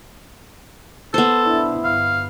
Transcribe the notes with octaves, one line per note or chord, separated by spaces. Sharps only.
B3 A4 C5
D4 E4
G1 F5